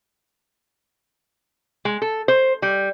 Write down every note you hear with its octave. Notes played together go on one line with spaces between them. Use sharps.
G#3
A4
C5
G3